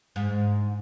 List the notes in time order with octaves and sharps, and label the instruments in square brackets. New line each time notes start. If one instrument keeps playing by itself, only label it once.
[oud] G#2